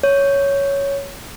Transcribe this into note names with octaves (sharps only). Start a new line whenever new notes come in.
C#5